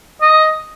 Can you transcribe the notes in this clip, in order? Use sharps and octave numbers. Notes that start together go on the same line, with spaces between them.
D#5